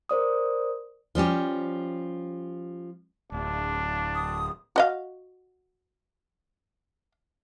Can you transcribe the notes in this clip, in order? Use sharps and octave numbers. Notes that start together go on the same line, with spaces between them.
A#4 C5 D5 D#6
F3 G3 C#4 G4
D1 D4
D#6
F#4 D#5 F5